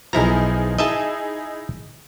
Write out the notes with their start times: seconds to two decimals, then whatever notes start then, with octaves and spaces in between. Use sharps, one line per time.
0.13 B1 F3 D#4 E4 G#4 A#5
0.79 D#4 E4 G#4 D#5 E5 A5